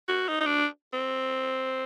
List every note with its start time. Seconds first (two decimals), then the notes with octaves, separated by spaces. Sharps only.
0.09 F#4
0.29 D#4
0.41 D#4
0.46 D4
0.94 C4